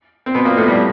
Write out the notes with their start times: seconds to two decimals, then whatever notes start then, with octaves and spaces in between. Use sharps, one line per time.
0.26 C4
0.34 B2 B3
0.45 A#2 A#3
0.56 A2 A3
0.68 G3